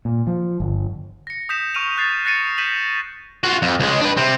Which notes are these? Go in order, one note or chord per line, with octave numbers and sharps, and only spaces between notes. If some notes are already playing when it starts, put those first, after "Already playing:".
A#2
F3
G1
A#6 C#7
D#6 G6 B6 E7
C#6 F6 D7 D#7 F7
C#6 F#6 A6 C7
F#6 A6 A#6 C7 C#7 D#7
G6 A#6 B6 D#7 E7 F#7
F4 F#4
F2
C#2 G#3
D4 B4
C3 C4